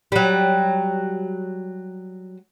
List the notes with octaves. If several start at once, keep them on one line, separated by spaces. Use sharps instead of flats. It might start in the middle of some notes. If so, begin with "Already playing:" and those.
F#3 G3